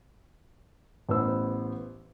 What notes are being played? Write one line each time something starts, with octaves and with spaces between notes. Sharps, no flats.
A1 B3 C5 E6